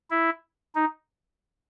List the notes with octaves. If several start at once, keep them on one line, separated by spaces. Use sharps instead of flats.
E4
D#4